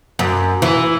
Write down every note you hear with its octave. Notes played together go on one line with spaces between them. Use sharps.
F#2
E3